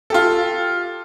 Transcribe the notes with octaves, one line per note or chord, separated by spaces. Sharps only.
F4 G4 A4